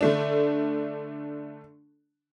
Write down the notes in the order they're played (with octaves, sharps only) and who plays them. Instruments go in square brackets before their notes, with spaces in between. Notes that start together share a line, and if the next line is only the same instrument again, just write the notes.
[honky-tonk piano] D3 A3 D4